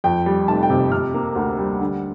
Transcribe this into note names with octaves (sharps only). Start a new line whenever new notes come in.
F2 G5
G3
F1 A5
G5
C3
C3 F6
A#3
D2
G3
D3